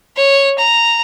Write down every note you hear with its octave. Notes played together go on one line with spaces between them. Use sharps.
C#5
A#5